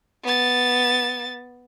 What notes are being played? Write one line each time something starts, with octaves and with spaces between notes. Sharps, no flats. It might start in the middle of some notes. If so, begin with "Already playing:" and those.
B3 A6